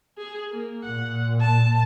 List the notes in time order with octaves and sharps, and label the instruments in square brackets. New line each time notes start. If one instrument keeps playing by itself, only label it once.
[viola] G#4
A#3
[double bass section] A#2 [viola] F#5
[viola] A5